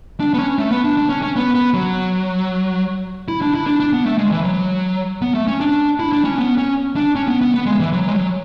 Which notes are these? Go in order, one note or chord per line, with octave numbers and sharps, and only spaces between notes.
D4
B3
C#4
A3
B3
D4
D4
C#4
C#4
B3
B3
F#3
E4
D4
E4
D4
D4
B3
A3
G#3
E3
F#3
B3
A3
C#4
D4
E4
D4
C#4
B3
C#4
D4
C#4
B3
B3
B3
G#3
E3
F#3
G#3
F#3